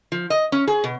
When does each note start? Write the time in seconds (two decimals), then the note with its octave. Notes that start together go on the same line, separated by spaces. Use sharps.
0.12 F3
0.30 D#5
0.52 C#4
0.67 G#4
0.84 B2